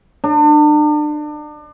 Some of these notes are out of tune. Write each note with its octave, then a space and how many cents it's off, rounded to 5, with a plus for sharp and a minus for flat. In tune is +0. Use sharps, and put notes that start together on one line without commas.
D4 +35